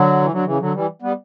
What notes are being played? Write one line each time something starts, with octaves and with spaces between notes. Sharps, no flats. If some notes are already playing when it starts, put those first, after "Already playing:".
Already playing: D3 F#3
E3
D3 F#3
C#3 E3
D3 F#3
E3 G3
G3 B3